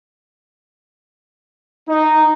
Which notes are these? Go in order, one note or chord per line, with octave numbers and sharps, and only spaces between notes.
D#4